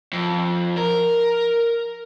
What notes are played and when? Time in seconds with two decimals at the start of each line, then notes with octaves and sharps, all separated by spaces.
0.13 F2
0.77 A#4